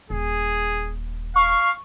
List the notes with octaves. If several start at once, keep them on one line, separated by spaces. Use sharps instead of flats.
D#1 G#4
F5 C#6